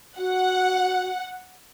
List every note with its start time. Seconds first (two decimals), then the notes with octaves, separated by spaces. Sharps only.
0.18 F#4 F#5